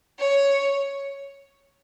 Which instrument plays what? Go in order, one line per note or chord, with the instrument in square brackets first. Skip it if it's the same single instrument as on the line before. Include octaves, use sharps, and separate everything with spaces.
[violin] C#5